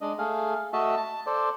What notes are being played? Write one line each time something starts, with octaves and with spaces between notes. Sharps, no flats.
G#3 D4 D#5
A3 G#4 F5
A3 F#4 D#5 E5 A5
A5
A4 C5 D5